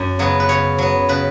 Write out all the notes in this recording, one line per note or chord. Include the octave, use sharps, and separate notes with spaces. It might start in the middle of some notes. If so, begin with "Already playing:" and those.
Already playing: F#2
C#3 F#3 B3
B4
C#3 C#5
F#3 B3
C#3 B4